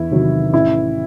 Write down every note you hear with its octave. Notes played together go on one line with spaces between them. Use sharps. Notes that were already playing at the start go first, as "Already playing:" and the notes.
Already playing: E2 E4
C3 D#3 F#3
A1 E4